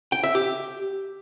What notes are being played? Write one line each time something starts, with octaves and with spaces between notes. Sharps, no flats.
G5
E5
G4